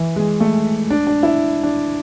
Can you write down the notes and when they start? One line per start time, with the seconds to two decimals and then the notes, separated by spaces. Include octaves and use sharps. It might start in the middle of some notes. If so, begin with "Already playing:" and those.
Already playing: E3
0.16 G#3
0.40 A3
0.90 D4
1.07 D4
1.23 E4
1.63 D4